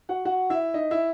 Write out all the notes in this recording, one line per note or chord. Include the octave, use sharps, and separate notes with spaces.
F#4 F#5
F#4 F#5
E4 E5
D#4 D#5
E4 E5